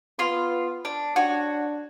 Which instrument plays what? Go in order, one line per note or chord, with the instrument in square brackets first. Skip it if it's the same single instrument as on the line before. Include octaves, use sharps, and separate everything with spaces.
[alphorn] B3 [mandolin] F4 C6
[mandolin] D4
[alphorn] D4 [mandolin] F#4 C#5